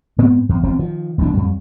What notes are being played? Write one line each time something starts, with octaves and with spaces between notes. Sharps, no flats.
G#2 B3 C4
E2
E1 F3 C4
D#3 F3
E1 C2 F#2 D4
F2 G3